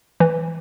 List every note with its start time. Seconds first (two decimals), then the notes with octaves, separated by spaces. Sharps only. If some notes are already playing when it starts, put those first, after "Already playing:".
0.20 E3